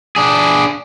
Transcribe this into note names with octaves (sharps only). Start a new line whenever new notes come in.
D4 G#4